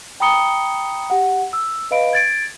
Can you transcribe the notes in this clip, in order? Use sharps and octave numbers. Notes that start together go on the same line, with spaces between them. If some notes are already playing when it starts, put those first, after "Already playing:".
G5 A#5 B5 D#6 C#7 G7
G4 F#5
E6
B4 D#5 F5 B5 D7
G#6 A6 D7